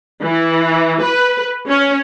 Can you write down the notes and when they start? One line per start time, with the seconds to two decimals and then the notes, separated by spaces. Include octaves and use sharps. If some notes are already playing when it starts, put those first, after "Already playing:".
0.22 E3
1.03 B4
1.68 C#4